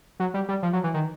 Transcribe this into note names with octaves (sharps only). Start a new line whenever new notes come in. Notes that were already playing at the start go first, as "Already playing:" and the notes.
F#3
G3
G3
F3
F#3
E3
D#3